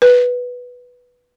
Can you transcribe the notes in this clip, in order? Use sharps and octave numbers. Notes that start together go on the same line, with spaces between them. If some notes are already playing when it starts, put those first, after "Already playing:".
B4